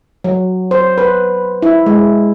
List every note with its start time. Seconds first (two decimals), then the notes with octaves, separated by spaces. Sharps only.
0.24 F#3
0.71 C5
0.98 B4
1.62 E4
1.86 G#3